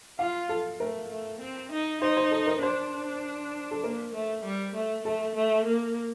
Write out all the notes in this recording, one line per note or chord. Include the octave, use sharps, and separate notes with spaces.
F4 F5
A4
A3 A#4
A3
C4
D#4
D#4 C5
C5
A4
A#4
D4 C5
A4
A#3 A#4
A3
G3
A3
A3 A4
A3
A#3